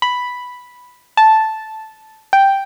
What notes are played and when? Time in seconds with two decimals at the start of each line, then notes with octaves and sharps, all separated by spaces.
0.02 B5
1.17 A5
2.33 G5